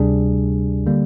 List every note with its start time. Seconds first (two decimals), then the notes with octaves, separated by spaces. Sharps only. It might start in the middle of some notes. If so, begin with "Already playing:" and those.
Already playing: D2 C3 G3 D4 G#4
0.86 D3 G3 A#3